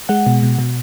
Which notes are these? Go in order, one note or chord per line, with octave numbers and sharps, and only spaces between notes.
G#3 F#5
B2
B2
B2